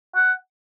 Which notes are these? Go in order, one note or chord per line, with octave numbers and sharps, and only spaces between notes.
F#5